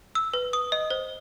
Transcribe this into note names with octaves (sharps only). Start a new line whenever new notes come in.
E6
B4
D#6
D#5
C5